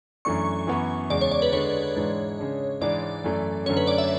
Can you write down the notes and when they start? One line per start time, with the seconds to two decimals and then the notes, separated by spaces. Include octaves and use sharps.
0.25 F#2 E3 A3 D4 C#6
0.67 F#2 E3 B3
1.10 E2 C#3 G#3 D5
1.21 C#5
1.31 D5
1.42 B4
1.53 D3 G#3 D4 C#5
1.96 G#2 E3 G#3 D4
2.39 C#3 G#3 D4
2.81 G#2 E3 G#3 D4 D5
3.24 F#2 E3 A3 E4
3.66 F#2 D3 A3 C#4 C#5
3.77 B4
3.87 D5
3.98 E5